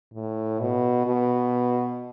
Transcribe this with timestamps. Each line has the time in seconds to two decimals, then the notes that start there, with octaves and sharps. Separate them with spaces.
0.14 A2
0.60 B2
1.06 B2